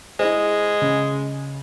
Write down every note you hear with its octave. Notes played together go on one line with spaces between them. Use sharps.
G#3 E4 C5
C#3